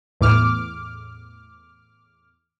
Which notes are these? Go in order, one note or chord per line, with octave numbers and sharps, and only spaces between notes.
E2 A2 D6 F6